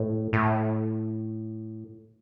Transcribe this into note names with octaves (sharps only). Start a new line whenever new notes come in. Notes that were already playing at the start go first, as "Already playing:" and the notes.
Already playing: A2
A2